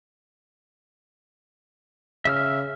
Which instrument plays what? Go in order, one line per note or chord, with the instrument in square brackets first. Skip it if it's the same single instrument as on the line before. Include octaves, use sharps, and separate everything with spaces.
[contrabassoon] C#3 [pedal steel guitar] E5 E6 F6